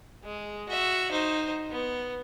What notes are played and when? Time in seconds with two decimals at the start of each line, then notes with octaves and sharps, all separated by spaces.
0.24 G#3
0.69 F#4 E5
1.11 D#4 C5
1.70 B3